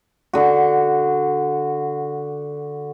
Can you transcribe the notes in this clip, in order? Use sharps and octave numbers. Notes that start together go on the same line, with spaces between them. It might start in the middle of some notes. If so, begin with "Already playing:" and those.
D3 F#4